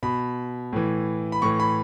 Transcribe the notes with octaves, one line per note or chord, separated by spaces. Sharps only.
B2 B5
A2 E3
B5
A2 E3 C#6
B5